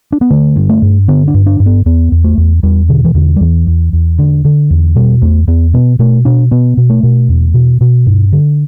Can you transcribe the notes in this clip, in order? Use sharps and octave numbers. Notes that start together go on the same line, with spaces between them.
D4
B3
D3 A3
G2
A3
G2
D3 B3
D4
G2
D4
G2
B3
E2 B3
E2
A3
E2
E2 G3
B2 D3
E3
E2 D3
G3
E2 E3
E2
E2
D3
D3
E2
B2 G3
E2 A3
E2 B3
B2 B3
B2 A3
B2 D4
B2 B3
B2
A3
B2
E2
B2
B2
G2
D3